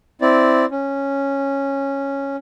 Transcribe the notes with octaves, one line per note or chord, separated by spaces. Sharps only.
C4 E4 D5
C#4